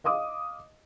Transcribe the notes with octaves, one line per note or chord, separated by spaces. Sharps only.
D#5 F5 D6 D#6